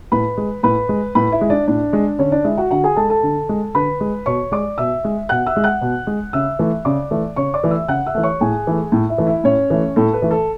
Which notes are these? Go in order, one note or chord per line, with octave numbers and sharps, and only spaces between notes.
A2 B4 B5
G#3
A2 B4 B5
G#3
A2 B4 B5
E4 E5
G#3
D4 D5
A2 D4 D5
G#3
D3 C#4 C#5
D4 D5
G#3 E4 E5
F#4 F#5
D3 F#4 F#5
G#4 G#5
G#3 A4 A5
A4 A5
D3
G#3
D3 B4 B5
G#3
B2 C#5 C#6
G#3 D5 D6
B2 E5 E6
G#3
B2 F#5 F#6
E5 E6
G#3
F#5 F#6
B2
G#3
C#3 E5 E6
E3 A3
C#3 D5 D6
E3 A3
C#3 C#5 C#6
D5 D6
E3 A3
E5 E6
C#3 F#5 F#6
E5 E6
E3 A3
C#5 C#6
A2 G#4 G#5
E3 A3
A2
E4 E5
E3 A3
E4 E5
A2 C#4 C#5
E3 A3
A2 A4
B4
E3 A3
A4